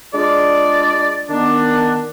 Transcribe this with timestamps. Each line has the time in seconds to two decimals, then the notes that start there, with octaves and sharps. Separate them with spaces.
0.15 G#3 D4 F4 G#4 D5
1.29 D#3 B3 D4